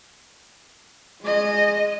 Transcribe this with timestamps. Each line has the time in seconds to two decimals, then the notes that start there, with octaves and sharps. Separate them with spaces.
1.21 G#3 D#5